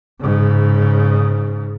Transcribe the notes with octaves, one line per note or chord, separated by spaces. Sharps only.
G#2 C#3